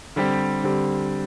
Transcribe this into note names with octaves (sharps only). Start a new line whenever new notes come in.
D3 G3 C4 G4
D3 G3 C4 G4